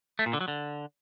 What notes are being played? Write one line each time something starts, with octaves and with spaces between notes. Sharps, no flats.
A3
A#2
D3
F#3
D3